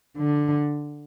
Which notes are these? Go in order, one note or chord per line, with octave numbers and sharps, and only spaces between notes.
D3